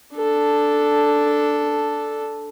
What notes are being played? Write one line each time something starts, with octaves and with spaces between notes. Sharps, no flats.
D4 A4